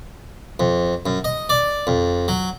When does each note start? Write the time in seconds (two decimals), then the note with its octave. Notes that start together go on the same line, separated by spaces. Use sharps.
0.60 F2
1.06 F#2
1.24 D#5
1.49 D5
1.87 F2
2.28 F#3